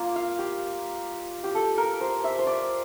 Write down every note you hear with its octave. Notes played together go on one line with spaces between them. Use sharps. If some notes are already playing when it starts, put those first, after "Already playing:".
Already playing: A#3 F4 D5
F5
G4
G4
A4
A#4
C5
E5
C5
D5